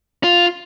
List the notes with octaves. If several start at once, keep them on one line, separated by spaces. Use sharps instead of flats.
F4